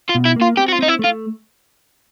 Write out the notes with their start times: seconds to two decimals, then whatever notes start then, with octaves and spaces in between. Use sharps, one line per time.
0.09 F4
0.15 B2
0.25 E4
0.36 A#3
0.41 F4
0.57 C4 G4
0.68 F#4
0.73 F4
0.79 C4 D#4
0.89 E4
0.99 A3
1.05 F4